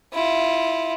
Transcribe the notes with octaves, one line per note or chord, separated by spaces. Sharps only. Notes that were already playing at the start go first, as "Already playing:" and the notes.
E4 F4